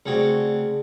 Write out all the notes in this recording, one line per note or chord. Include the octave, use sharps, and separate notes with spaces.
C#3 A3 C4 F#4 G#4 D5